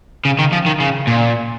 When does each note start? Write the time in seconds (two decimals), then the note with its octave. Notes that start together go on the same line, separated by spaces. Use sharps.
0.25 C#3
0.39 D#3
0.52 F3
0.66 D#3
0.80 C#3
1.07 A#2